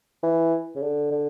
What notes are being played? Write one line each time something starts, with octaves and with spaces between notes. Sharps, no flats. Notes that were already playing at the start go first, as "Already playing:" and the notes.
E3
C#3
D3
D3